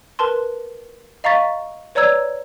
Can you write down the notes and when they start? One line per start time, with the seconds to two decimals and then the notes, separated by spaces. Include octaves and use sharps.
0.19 A#4 B4 A5 C6
1.24 D#5 F5 A#5 C#6 A6 B6
1.95 B4 C#5 D5 A#5 E6 G#6